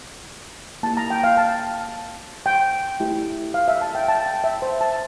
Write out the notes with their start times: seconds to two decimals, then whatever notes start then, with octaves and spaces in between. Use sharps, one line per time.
0.83 A#3 E4 G4 A5
0.97 A#5
1.10 G5
1.24 F5
1.37 A5
2.46 G5
3.00 A3 E4 G4
3.54 F5
3.68 E5
3.81 A5
3.95 G5
4.08 A5
4.26 G5
4.44 E5
4.62 C5
4.81 A5